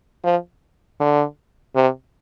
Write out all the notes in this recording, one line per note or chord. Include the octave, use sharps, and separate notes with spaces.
F3
D3
C3